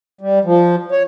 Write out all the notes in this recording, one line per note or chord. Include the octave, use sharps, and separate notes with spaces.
G3
F3
C#5